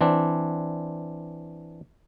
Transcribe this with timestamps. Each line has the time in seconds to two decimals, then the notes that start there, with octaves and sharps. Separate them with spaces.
0.01 E3 C4 D4